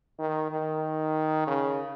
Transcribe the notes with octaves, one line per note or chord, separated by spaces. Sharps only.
D#3
D#3
C#3